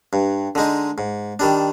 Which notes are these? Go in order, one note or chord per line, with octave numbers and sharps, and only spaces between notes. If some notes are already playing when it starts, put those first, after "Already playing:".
G2
D3 G#3 D#4
G#2
D#3 G3 D4